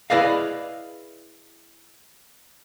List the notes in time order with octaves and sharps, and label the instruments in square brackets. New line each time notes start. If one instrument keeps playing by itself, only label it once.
[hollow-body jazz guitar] E4 G#4 B4 D5 D#5 F5